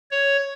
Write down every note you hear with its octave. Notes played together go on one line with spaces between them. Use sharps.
C#5